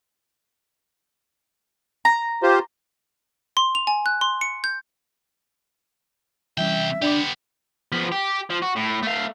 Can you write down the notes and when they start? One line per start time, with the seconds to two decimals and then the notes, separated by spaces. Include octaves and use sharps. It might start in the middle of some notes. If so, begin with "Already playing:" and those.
2.05 A#5
2.43 F4 G4 C5
3.57 C6
3.75 F7
3.87 G#5
4.06 F#6
4.21 C6
4.41 C#7
4.64 G6
6.58 C2 E3 G3 C#4 E5 G5
7.02 B3 D4 G4 D5 D6
7.92 F3 B3
8.12 G4
8.50 F3
8.62 F#4
8.76 A2
9.03 A3 F5